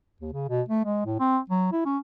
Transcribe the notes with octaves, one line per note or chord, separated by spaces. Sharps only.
D#2
C#3
B2
A3
G#3
A2
C4
F#3
E4
C#4